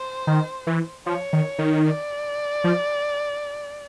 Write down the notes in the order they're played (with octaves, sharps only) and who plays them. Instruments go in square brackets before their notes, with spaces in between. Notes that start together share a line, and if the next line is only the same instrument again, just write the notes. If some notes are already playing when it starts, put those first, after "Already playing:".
Already playing: [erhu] C5
[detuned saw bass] D#3
E3
[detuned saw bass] F3 [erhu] C#5
[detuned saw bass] D#3
D#3
[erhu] D5
[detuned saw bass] F3